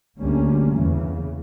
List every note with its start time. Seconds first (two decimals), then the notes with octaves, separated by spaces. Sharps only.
0.21 D2 D3 G3 A#3 C#4
0.74 E2 C#3 E3